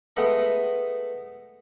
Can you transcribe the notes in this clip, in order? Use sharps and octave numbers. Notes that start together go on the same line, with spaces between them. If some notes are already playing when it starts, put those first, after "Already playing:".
G#3 A3 B3 D#5 B5